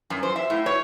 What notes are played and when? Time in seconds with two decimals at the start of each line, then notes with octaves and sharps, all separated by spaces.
0.10 F#2
0.23 C5
0.36 E5
0.50 A2
0.66 C#5